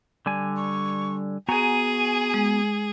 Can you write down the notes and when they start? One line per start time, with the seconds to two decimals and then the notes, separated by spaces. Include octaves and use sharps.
0.26 D3 G3 G#5
0.56 C#6
1.49 B3 F#4 G#4 G#5 A#5
2.34 G#3